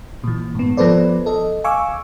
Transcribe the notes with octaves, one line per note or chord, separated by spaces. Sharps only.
A#2 E3
G#2 B3
F3 B3 A4 B4 C5 D5
A4 D#5
F5 G#5 C#6 D6 E6